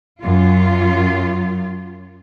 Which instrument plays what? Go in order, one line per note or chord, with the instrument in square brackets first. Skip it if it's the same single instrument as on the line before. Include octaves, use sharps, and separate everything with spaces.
[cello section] F#2 F4